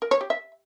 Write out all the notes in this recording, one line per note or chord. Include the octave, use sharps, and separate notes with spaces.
A#4
C#5
G4
E5